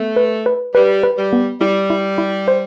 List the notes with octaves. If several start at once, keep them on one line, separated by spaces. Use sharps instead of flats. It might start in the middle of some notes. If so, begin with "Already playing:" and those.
Already playing: A3 B3
B4
B4
G3 B4
B4
G3
B3
G3 E4
E4
E4
C5